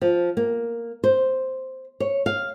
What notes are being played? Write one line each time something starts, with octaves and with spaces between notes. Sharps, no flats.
F3
A#3
C5
C#5
F5